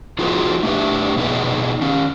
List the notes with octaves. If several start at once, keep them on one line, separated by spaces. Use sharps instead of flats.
F3 D#4 F4 F#4 G#4 B4
A3 D4 G4 B4
B2 B3 D#4 G#4 B4
D#3 C#4